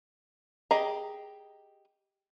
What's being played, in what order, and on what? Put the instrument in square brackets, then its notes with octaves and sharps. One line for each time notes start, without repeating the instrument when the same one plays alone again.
[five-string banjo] G4 G#4 D#5 A#5